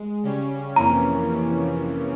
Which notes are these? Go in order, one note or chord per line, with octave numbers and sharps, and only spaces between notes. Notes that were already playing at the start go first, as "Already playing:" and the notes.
Already playing: G#3
C#3 G3 C#4
F2 C3 E3 A#3 C#4 A#5